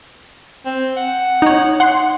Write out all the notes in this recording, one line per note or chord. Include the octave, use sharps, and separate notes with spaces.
C4
F#5
D#4 C#5
F#5 C6